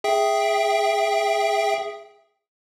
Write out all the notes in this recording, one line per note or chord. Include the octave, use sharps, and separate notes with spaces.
G#4 E5 G5